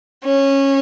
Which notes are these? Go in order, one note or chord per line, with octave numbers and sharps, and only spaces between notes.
C#4